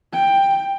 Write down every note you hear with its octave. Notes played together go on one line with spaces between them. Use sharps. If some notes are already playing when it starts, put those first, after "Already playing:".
G5